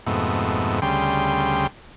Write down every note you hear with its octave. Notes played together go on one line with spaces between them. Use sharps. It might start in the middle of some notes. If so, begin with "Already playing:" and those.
F2 G#2 B2 A3
D2 C#3 G3 G5 C6